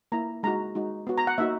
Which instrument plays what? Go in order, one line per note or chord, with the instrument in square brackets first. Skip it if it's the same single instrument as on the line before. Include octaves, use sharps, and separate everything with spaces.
[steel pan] A#3 E4 A#5
G#3 D#4 F#4 A#5
G#3 D#4 F#4
B3 F#4
A#5
F#5
A#3 D#4 F#4 E5